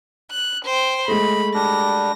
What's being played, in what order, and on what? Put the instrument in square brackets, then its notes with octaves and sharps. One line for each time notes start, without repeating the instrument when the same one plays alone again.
[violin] F#6
C5 G5
[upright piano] G#3 A3 [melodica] D#5 [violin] B5
[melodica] G3 D4 [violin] A#6